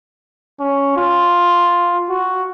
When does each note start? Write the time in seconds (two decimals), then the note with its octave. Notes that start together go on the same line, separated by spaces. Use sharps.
0.60 C#4
0.97 F4
2.09 F#4